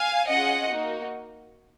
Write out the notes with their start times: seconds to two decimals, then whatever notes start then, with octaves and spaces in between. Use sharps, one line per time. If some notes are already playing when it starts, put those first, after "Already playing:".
Already playing: F5 G#5
0.29 C#4 F4 G#4 D#5 F#5
0.71 A#3 D#4 F#4